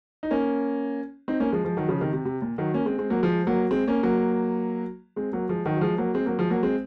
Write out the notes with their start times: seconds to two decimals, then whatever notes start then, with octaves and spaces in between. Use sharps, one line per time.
0.23 D#4
0.31 A#3 C#4
1.28 C4 D#4
1.40 A#3 C#4
1.52 F3 G#3
1.65 F3 G#3
1.77 D#3 F#3
1.89 C#3 F3
2.01 C3 D#3
2.13 C3
2.25 C3
2.42 A#2
2.58 D#3 F#3
2.74 A#3 C#4
2.85 G#3 C4
2.98 G#3 C4
3.10 F#3 A#3
3.23 F3 G#3
3.47 F#3 A#3
3.71 G#3 C4
3.88 A#3 C#4
4.03 F#3 A#3
5.16 G#3 C4
5.33 F#3 A#3
5.49 F3 G#3
5.65 D#3 F#3
5.76 F#3
5.81 F3 G#3
5.98 F#3 A#3
6.14 G#3 C4
6.26 F#3 A#3
6.38 F3 G#3
6.50 F#3 A#3
6.63 G#3 C4